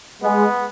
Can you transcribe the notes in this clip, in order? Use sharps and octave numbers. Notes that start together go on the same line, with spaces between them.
G#3 B3